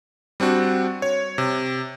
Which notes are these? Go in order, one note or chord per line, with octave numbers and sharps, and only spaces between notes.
G3 C4 D4 F#4
C#5
C3